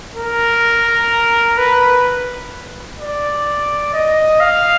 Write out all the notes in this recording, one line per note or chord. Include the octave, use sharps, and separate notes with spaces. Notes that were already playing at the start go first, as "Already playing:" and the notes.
A#4
B4
D5
D#5
F5